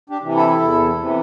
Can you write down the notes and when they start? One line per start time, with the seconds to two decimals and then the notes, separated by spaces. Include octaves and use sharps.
0.10 D4 G4
0.22 C3 E3
0.35 E4 A4
0.60 E2
0.97 C3 E3